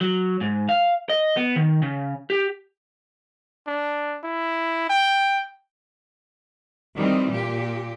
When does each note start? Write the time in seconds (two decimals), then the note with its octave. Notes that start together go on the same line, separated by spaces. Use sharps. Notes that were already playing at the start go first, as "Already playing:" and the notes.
0.01 F#3
0.41 G#2
0.69 F5
1.09 D#5
1.37 B3
1.56 D#3
1.82 C#3
2.30 G4
3.67 D4
4.24 E4
4.90 G5
6.97 D#3 E3 G3 C4
7.29 A#2 G4